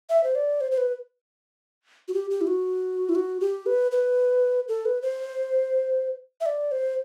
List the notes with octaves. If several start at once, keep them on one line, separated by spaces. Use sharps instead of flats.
E5
C5
D5
C5
C5
B4
F#4
G4
G4
E4
F#4
E4
F#4
G4
B4
B4
A4
B4
C5
E5
D5
C5